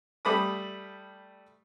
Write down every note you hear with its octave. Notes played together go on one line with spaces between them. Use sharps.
G3 A3 B5 D6 D#6